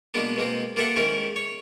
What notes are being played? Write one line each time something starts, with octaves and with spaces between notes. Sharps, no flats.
B2 G#3 A#3 B3 D4
B2 G#3 A#3 C4
A#3 F4 G4 A4 E5 F#5
G#2 D#3 C#4 E4 A#4
C#5